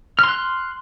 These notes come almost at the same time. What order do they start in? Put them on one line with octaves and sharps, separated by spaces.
F6 C6 F#6